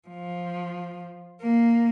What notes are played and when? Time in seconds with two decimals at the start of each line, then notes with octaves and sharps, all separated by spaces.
0.08 F3
1.42 A#3